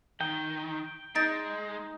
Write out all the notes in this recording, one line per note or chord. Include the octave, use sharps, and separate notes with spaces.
D#3 G5
G#3 D#4 A6 D7